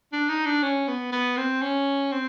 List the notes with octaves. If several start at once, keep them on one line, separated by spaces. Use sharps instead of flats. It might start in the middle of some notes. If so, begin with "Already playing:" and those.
D4
D#4
D4
C#4
B3
B3
C4
C#4
C4